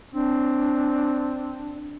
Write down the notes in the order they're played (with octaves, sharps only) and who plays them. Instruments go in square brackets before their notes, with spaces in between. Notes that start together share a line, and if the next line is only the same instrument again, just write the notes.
[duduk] C4 [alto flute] D4